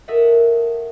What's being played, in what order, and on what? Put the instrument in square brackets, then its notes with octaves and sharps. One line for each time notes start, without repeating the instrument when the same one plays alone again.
[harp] F#4 A4 A#4 D#5 E5 F#5